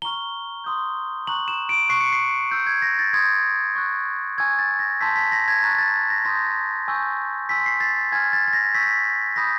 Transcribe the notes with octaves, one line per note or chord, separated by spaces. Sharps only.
A#5 C#6 F6 G7
C6 D#6 G6
A#5 C#6 F#6 F#7
E7
D7
C#6 F#6 C7
C#7
C7
C#6 E6 G6
G#6
A#6
A6
C6 D#6 G6 G#6
C#6 F#6
G#5 C#6 E6 G#6
A6
A#6
A5 C6 E6 G6 B6
B6
A#6
G#6
A#5 C#6 F#6 A6
A6
A#6
C6 D#6 G6 A#6
G#5 C#6 E6 G6
G#5 C6 E6 B6
C7
A6
G#5 C6 F6 G#6
A6
A6
A#6
C#6 E6 G6 B6
B5 D#6 G6 A#6